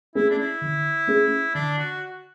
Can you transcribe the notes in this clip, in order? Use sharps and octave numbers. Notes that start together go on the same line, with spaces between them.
A3 C#4 E4 G#4
D4
E4
D3
A3 C#4 G#4
D3 D4
F#4